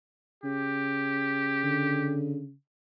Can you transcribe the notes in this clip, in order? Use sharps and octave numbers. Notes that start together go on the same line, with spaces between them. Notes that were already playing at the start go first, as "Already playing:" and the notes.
C#3 G4
D3